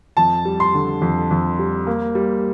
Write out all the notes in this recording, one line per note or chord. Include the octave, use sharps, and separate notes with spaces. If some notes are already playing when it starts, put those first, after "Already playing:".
F2 A5
G3
C6
D3
F2
F2
G3
A#3
G3